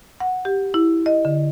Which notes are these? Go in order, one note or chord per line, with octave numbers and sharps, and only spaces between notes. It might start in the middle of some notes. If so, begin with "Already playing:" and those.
F#5
G4
E4
D#5
D3